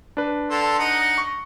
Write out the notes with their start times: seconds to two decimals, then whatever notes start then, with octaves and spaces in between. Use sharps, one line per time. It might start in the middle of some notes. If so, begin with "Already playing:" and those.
0.17 D4 B4
0.50 D3 A4 C6
0.79 D#4 D#5 F#5
1.18 C#6